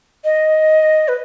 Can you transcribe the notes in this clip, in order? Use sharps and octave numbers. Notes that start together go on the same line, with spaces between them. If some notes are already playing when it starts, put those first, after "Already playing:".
D#5
B4